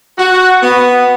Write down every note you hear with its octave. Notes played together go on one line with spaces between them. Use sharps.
F#4
B3